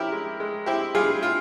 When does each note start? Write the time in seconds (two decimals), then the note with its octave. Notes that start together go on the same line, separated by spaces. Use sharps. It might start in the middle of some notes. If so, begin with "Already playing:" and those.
Already playing: F3 C#4 E4 G4 A#4
0.12 G#3
0.40 G#3
0.66 C4 E4 G4
0.95 G3 F4 G#4
1.21 E4 F4